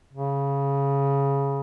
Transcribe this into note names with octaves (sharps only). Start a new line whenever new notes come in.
C#3